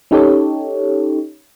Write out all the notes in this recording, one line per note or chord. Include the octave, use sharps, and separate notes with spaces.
C#4 D#4 G4 A4 C#5